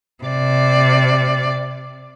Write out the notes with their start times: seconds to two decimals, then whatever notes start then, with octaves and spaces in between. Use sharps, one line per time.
0.24 C3 D5